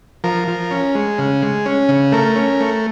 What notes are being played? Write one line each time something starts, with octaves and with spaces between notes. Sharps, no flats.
F3 A#4
F3
C#4
G#3
C#3
G#3
C#4
C#3
A3 A#4
C#4
A3